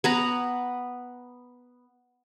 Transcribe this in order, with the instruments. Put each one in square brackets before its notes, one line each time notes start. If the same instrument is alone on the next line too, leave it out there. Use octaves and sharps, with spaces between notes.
[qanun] B3 B4 A#5